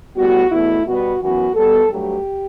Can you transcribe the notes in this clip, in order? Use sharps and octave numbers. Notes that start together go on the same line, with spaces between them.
A2 G3 B3 F#4
E2 B2 A3 E4
B2 G3 B3 F#4
F#2 E3 B3 F#4
B2 G3 B3 A4
G2 F#3 A3 G4